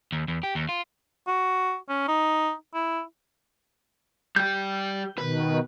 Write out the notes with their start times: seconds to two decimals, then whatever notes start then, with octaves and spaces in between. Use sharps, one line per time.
0.12 D#2
0.28 E2
0.43 G4
0.55 D#2
0.69 F4
1.27 F#4
1.89 C#4
2.08 D#4
2.74 E4
4.36 G3 G4 G6
5.18 B2 D#3 B4